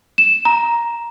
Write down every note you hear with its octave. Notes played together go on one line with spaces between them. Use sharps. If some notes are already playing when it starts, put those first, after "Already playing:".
E7
A#5